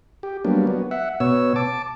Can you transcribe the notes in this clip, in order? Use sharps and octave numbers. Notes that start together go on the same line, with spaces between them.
G4
F#3 G3 A#3 B3 D4
F#3 B3
E5 F#5
B2 B3 C#5 E6
A5 D6